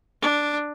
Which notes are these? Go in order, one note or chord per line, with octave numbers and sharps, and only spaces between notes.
D4